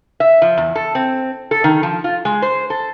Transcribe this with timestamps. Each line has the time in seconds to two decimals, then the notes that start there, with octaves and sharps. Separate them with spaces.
0.20 E5
0.42 F3
0.58 E2
0.75 A4
0.95 C4
1.51 A4
1.64 D#3
1.83 F3
2.04 F4
2.25 G#3
2.42 C5
2.70 A4